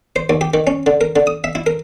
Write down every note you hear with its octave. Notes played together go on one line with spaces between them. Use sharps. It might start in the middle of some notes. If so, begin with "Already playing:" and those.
C5
D#2
G4
D#3
C#4
D3
A#4
D3
D#6
E5
E4
A#4